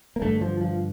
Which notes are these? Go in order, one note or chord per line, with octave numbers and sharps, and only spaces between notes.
A#3
G2 D3 A3
F3
F3